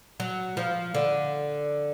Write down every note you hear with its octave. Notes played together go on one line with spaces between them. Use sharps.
F#3
F3
D3